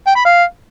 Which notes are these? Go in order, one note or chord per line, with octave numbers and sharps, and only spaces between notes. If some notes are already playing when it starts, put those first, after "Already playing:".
G5
B5
F5